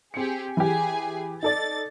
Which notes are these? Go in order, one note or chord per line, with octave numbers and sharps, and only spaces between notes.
C4 G4 G#4 C#7
E3 G4 G#4 G#5
D#4 A4 D5 A6